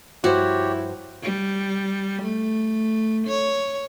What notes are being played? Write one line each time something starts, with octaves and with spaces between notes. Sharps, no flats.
G2 F3 E4 F#4 G4 C5 C#5
G3
A3
C#5